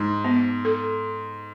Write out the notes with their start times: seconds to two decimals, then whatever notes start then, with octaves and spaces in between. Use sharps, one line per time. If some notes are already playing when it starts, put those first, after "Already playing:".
Already playing: G#2
0.25 B3
0.65 A4